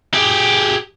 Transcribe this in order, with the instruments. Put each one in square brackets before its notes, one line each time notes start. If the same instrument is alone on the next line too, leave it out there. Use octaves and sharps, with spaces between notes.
[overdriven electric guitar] G4 G#4